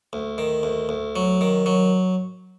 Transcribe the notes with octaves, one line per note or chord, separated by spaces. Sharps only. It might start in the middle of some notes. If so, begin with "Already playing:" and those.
D2
D#3
D2
D2
F#3
D#3
F#3